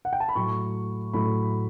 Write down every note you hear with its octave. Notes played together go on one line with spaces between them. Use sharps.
F#5
G5
A5
B5
A2 F#3 A3 C#6
A2 F#3 A3 B5